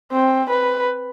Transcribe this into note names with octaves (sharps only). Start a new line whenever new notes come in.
C4
B4